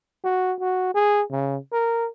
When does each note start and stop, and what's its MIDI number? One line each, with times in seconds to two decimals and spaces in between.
0.24 0.54 66
0.60 0.92 66
0.94 1.23 68
1.31 1.57 49
1.72 2.08 70